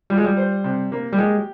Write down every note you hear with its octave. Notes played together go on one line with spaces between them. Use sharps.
G3 F4
G#3
G3
C5
C3
A#3
G3
G#3 G4